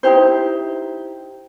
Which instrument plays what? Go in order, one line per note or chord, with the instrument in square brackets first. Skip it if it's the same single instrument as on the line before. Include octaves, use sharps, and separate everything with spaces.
[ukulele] D#4 E4 G4 C5